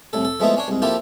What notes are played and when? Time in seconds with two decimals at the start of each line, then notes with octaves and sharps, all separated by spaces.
0.13 C2 A2 A4
0.25 A4
0.40 F3 G#3 A3 B3 E4 F4
0.56 C#4 D4 C#5
0.68 C2 G#2
0.82 F3 A#3 E4 F4 G4 A4